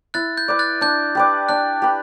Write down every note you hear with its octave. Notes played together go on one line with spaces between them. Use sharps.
E4 F#6 A6
G6
B4 D5
F#6 A6
D4 G6
G4 B4 D5
D4 F#6
G4 B4